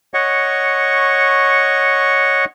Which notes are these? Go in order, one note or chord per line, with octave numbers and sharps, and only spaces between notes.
C#5 D#5 F#5 C#6